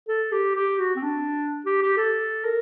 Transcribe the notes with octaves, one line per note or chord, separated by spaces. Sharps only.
A4
G4
G4
F#4
C4
D4
G4
G4
A4
A#4